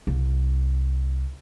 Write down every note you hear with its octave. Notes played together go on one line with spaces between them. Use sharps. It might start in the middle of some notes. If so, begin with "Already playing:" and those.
C2